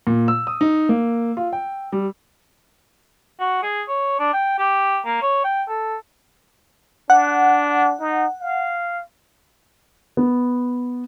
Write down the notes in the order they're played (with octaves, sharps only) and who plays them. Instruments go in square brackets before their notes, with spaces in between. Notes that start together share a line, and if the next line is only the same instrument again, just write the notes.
[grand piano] A#2
E6
D#6
D#4
A#3
F4
G5
G3
[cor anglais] F#4
G#4
C#5
D4
G5
G4
A#3
C#5
G5
A4
[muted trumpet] D4 [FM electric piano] F#5
[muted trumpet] D#4
F5
[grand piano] B3